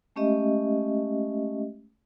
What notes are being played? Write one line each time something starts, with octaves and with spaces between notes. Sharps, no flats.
G#3 A3 C#4 G4 D#5 E5